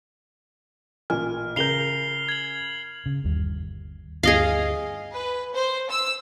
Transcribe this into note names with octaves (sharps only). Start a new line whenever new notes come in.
A1 A#2 G#5 F6
C#3 A#4 G6 C7 F7 G7
G#6 F#7
C#3
G1 D#2 G3
D2 G2 G#4 D#5 F5
B4
C5
E6